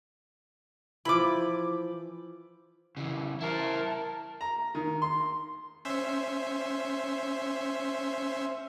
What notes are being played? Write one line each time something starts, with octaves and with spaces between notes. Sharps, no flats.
E3 F3 B5 D6
C#3 E3
E4 A#4 C5 A5
A#5
D#3
C6
C#4 C5 E5